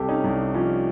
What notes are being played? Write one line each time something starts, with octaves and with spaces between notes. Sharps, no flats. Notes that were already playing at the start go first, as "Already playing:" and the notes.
Already playing: C2 C3 G4 A4
C#4 D#4
C2
F3 C#4